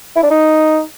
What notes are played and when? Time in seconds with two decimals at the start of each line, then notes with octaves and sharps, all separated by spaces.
0.16 E4
0.23 D4
0.30 D#4